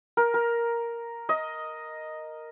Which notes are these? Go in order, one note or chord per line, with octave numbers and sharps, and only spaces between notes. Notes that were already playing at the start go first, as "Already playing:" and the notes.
A#4
A#4
D#5